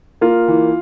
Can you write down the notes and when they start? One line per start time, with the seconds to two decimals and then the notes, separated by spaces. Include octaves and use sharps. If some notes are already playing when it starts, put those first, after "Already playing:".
0.21 A#3 F4
0.48 E3